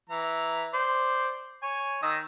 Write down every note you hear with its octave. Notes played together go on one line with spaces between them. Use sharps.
E3 A#5
C5 D5
C#5 G#5
D#3 D#5 E6